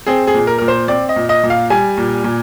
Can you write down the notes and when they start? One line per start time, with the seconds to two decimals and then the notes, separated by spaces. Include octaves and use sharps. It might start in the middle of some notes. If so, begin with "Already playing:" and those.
0.07 C4 G#4
0.27 G#4
0.34 A#2
0.47 A#4
0.58 A#2 A#4
0.68 C5
0.88 C4 D5
1.09 D#5
1.16 A#2
1.29 D#5
1.43 A#2
1.50 F5
1.70 G3 G#5
1.97 A#2
2.24 A#2